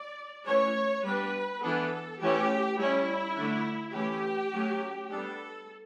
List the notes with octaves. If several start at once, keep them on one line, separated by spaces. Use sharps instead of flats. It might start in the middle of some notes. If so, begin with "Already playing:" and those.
Already playing: D5
E3 A3 C#4 C#5
G3 B3 D4 B4
E3 B3 D4 A4
E3 A3 C#4 G4
G3 C#4 E4
D3 A3 D4
E3 A3 C#4 G4
F#3 A3 C#4
G3 B3 D4 A4